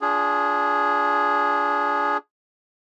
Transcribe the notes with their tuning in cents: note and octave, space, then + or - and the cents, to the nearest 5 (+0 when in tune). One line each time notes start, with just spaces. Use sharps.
D4 -25 F4 +0 G#4 +0